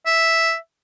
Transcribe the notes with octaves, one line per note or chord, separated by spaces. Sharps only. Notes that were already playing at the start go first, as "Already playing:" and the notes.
E5